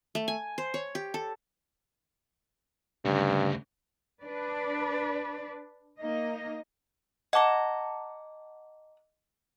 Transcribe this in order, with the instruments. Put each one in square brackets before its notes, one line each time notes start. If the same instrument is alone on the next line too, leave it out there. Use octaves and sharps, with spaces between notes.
[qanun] A3
G#5
C5
C#5
G4
A4
[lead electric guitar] D2 C#3 [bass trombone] G2
[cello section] D4 B4 D5
A#3 D#4 D#5
[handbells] D#5 D6 [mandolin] F#5 A5 A#5